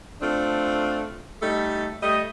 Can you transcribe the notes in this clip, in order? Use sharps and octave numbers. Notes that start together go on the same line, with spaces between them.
A3 C4 D4 F4
G3 A3 D#4 A4
G3 A3 D#5